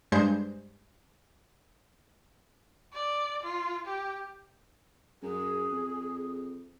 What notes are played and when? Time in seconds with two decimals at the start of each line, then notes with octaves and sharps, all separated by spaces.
0.12 G2 G#3 C5 G6
2.93 D5
3.43 F4
3.86 G4
5.22 F#2 G#4
5.71 F2